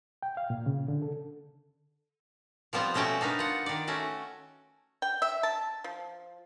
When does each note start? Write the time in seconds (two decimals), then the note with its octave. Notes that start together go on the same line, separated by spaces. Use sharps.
0.23 G5
0.37 F5
0.50 A#2
0.66 C#3
0.88 D3
1.02 A4
2.73 F3 G3 B3 C4 F4
2.94 B2 A3 C#4 F#4 G5 A5
3.21 D4 D#4 A#4 B4
3.39 F4 F#5
3.66 D#3 D5
3.87 A3 C#4 F#4
5.02 G5
5.22 E5
5.43 A5
5.84 F3